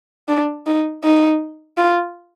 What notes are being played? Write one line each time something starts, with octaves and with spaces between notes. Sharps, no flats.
D4
D#4
D#4
F4